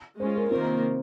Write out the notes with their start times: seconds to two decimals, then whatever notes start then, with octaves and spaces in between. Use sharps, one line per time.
0.20 G#3 C#4 F4 C5
0.36 A#4
0.51 C3 D#3 A#3 C4 F4 A#4